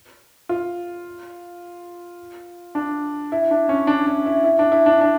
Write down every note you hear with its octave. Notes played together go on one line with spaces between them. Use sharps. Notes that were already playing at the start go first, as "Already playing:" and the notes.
F4
D4
E4
D4
C#4
D4
D4
E4
E4
D4
E4
D4
D4